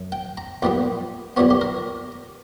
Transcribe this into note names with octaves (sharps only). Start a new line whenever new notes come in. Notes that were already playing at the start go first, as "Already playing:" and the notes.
Already playing: F#2
G5
A#5
B1 A#2 G3 B3 G5
B1 A#2 G3 B3 C#5
G4
A#4